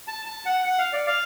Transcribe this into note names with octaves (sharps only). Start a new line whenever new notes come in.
A5
A5
F#5
F#5
F5
D5
F5